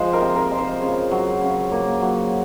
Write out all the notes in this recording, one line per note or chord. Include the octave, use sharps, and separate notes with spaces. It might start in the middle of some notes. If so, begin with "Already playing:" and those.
Already playing: F3 G#3 C5
A#4
C3
A#4
G#3
C5
C#3
F#3
C#3
A#3
F#3